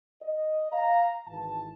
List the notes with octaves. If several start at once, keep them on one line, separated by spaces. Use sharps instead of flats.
D#5
F5 A#5
G#1 E3 A5